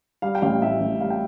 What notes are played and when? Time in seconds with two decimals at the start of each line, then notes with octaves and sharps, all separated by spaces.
0.22 G3 F5
0.35 G5
0.42 A1 F5
0.62 A2 E5
0.81 A1
1.00 G3 F5
1.10 G5